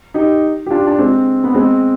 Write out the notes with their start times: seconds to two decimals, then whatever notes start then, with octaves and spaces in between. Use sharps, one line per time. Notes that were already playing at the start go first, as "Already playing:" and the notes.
0.14 D#4 G4
0.66 G4
0.70 D4 F4
0.87 D4
0.99 G#3 C4
1.44 B3
1.55 G#3 C4